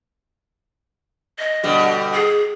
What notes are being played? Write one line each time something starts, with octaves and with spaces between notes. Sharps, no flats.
D#5
B2 D3 G3
G#4